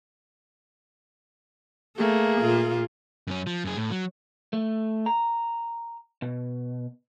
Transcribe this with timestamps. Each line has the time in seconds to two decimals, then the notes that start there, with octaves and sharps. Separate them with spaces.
1.98 A3 A#3 G#4
2.39 A#2 F4
3.27 F#2 C#4
3.47 F3
3.65 F#2 G#4
3.76 A2
3.91 F#3
4.53 A3
5.06 A#5
6.22 B2